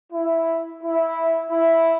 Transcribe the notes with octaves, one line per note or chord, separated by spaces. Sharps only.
E4
E4
E4